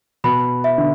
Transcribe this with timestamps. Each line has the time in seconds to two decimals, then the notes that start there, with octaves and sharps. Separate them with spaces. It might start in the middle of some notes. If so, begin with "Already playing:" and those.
0.24 B2 B3 B5
0.64 E5
0.78 D3